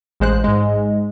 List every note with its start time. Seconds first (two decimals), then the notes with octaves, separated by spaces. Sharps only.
0.20 A1 G#3 C5 F#6
0.44 G#2 G#3